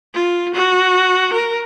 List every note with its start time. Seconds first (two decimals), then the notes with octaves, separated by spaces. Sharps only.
0.14 F4
0.54 F#4
1.33 A#4